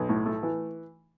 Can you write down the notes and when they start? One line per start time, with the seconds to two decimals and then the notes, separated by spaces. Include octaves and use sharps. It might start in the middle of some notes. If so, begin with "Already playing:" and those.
Already playing: B1
0.09 A2
0.26 A3
0.43 E3